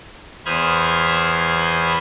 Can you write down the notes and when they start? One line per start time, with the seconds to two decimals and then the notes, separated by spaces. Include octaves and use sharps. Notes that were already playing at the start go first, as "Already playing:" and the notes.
0.46 E2 C5 B5 D#6 F6 G#6